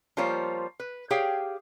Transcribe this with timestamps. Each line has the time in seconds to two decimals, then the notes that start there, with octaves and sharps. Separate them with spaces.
0.17 F3 G3 A#3 F4 C5 C#5
0.80 B4
1.11 G4 G#4 C#5 F5 G5